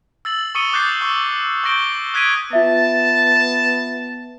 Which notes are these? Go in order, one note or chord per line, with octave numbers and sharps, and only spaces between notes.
E6 A6 F#7
C#6 D#6 E6 C#7 D#7 G7
D6 D#6 F#6 G6 A6 C7
C#6 E6
C#6 G6 A#6 D7 G7
D#6 F#6 G#6 B6 D7 D#7
B3 F4 E5 A5